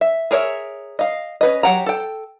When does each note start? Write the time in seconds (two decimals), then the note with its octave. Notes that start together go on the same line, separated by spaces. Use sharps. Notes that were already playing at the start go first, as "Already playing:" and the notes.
0.01 E5
0.31 G#4 A#4 C#5 D5 E5
0.99 D#5 F5
1.41 C#4 B4 D#5
1.63 F#3 G4 F#5 G5 A#5
1.86 A4 G5